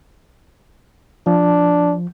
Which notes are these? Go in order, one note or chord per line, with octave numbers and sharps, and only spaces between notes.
F3 D4